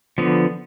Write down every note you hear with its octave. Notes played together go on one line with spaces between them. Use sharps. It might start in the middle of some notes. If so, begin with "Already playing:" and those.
D3 F3 B3